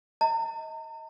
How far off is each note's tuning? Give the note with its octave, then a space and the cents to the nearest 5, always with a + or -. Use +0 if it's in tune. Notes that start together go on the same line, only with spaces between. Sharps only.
D#5 +25 A#5 -40